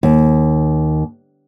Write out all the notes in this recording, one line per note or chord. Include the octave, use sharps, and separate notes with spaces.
D#2